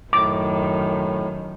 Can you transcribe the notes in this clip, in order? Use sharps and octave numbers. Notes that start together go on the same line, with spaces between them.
F#2 A2 D#3 D6